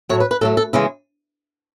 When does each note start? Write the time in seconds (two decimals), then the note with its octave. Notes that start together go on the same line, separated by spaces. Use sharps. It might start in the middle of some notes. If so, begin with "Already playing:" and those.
0.09 A2 F#3 A3 C#5
0.20 B4
0.31 B4
0.41 A2 F#3 A3 A4
0.57 A4
0.73 C#3 E3 G#3 E4